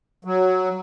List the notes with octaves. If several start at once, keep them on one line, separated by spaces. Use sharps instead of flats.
F#3